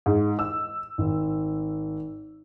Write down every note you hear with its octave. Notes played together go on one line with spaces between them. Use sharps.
G#2
E6
G#1